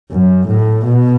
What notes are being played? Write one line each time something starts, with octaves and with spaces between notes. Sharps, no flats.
F#2
A2
B2